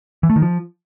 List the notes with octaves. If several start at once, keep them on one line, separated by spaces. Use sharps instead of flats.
E3
A3
D#3
F3